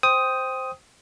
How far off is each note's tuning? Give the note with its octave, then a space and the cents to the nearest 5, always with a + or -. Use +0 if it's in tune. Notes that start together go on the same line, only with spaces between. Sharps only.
C5 +0 G5 +0 D#6 +10